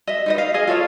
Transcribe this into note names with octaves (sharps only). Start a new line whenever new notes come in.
D#5 E5
D#4 B4 D#5
F5
G#4 D#5 F5
F4 A4 C#5 F5